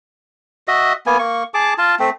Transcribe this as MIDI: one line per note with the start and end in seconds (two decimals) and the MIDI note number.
0.68 0.93 66
0.68 0.93 75
0.68 0.93 76
1.06 1.18 58
1.06 1.18 59
1.06 1.18 80
1.19 1.43 58
1.19 1.43 85
1.54 1.74 68
1.54 1.74 81
1.54 1.74 86
1.78 1.95 65
1.78 1.95 81
2.00 2.10 57
2.00 2.10 60